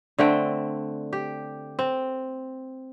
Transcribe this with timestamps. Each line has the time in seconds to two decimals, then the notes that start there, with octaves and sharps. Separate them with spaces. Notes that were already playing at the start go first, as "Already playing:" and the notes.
0.19 D3 A3 C4 G5
1.13 G4
1.79 C4